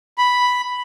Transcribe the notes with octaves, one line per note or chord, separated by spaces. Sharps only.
B5